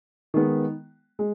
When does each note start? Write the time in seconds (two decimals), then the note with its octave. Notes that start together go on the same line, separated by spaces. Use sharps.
0.34 D#3 G#3 B3
1.19 G#3